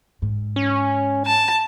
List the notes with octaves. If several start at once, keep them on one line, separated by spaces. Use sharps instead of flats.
G#2
C#4
A5